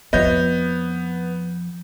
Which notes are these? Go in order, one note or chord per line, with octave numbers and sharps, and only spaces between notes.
F2 F3 B3 F4 C#5 D#5 G6